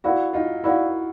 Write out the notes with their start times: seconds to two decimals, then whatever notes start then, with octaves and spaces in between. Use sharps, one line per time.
0.04 E4 F#4 A#4 D5 F5
0.33 D#4 F4
0.64 E4 F#4 A#4 D5 F5